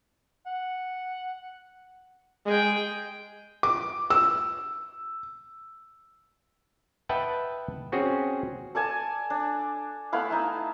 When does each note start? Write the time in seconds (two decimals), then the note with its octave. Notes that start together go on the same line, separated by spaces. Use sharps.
0.46 F#5
2.46 G#3 G#4 G5
3.63 D6
4.10 E6
7.09 B4 D#5 E5 F#5 G5 A5
7.92 C4 C#4 F#4 G#4
8.75 A4 D5 G#5 A5
9.30 D4
10.13 A3 B3 E4 F5
10.30 D#4 E5 A5